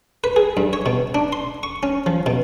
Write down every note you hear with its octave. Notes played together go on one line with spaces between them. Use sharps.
B4
G#4
G2
C#5
B2
D4
C6
C#6
C#4
F3
B2